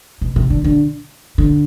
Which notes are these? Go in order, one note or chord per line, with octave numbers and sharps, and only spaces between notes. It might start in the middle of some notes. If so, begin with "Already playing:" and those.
B2
C3
D3
D3
D3